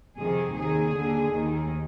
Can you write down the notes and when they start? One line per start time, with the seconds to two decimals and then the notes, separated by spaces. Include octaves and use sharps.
0.17 F2 C3 D#3 G#4
0.54 D#2 D#3 G#4
0.94 D#2 D3
1.32 D#2 D#3